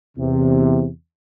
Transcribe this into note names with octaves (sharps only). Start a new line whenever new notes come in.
E2 C3